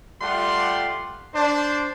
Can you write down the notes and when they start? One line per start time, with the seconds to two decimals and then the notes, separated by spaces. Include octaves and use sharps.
0.22 G3 A3 F4 G4 F#5 C6
1.34 D4 C5